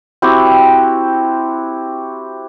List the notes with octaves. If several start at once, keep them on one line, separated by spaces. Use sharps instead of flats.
C4 E4 F#4 G4